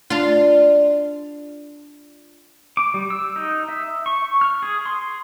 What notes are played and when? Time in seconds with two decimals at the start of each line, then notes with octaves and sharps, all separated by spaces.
0.10 D4 F4
2.77 D6
2.94 G3
3.10 E6
3.36 D#4
3.69 E5
4.06 C#6
4.41 F6
4.62 G#4
4.86 C6